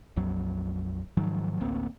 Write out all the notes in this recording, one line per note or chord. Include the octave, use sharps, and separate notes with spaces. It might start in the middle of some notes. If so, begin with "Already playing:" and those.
A#1 F2 F#3
G#2 D#3 F3 F#3
A1 D2 A#3 C4